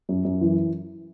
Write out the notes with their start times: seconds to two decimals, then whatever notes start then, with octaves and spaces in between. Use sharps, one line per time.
0.09 F#2
0.25 F#2
0.41 E3